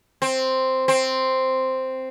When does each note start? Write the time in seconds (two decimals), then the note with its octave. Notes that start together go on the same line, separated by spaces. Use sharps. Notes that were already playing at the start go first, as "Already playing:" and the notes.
0.22 C4
0.88 C4